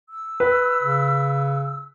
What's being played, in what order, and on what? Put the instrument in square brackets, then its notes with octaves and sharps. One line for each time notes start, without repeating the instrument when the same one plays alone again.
[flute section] E6
[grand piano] B4
[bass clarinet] C#3